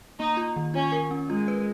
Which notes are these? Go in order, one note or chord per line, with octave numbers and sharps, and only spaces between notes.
A#3 D#4
F4
D#3
C#4 F4
A#4
C#4
G#3 F4
B4